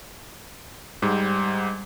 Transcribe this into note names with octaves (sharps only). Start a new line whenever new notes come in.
G#2 G3